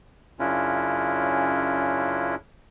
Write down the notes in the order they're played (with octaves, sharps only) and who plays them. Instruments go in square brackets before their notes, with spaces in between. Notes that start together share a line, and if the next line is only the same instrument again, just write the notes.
[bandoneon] F#2 C#3 C#4 D4 E4 F4